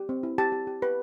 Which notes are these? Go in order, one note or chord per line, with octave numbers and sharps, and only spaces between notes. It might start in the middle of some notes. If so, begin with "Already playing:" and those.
Already playing: G4
C4
E4
G4 A5
G4
G4
G4 B4